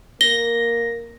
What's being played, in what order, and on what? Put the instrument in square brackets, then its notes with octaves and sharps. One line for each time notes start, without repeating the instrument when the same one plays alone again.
[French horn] A#3 [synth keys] A#6 [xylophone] G7